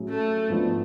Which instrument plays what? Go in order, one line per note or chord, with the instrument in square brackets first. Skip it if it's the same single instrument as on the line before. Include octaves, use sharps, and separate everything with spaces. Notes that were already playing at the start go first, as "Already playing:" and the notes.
Already playing: [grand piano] A2 F#3 C#4 G#4
[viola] A3
[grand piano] G#2 F3 B3 D4